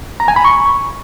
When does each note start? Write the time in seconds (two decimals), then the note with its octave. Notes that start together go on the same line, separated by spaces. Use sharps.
0.20 A#5
0.28 G#5
0.36 B5
0.44 C#6